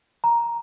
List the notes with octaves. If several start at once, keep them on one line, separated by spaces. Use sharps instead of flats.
A#5